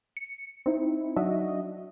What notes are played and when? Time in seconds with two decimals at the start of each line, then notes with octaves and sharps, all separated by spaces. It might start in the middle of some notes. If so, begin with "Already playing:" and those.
0.17 C#7
0.66 C4 D#4 E4
1.16 F#3 D4 D#4 F#4 D#5 E5